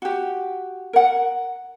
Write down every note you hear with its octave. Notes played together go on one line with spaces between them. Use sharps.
F#4 G4
A#4 F#5